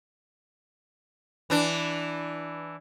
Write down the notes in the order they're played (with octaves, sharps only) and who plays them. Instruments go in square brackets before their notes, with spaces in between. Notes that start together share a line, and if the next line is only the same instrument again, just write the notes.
[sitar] E3 D4